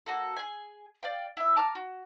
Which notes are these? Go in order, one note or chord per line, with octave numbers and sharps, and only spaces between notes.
A#3 D#4 F#4 A4
G#4 G#5
D5 F5 G5
E4 E5
A5 A#5 D6 F6
F#4